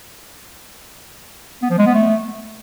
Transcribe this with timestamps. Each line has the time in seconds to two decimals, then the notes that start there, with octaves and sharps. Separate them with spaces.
1.62 B3
1.70 F3
1.78 G#3
1.86 B3
1.94 A3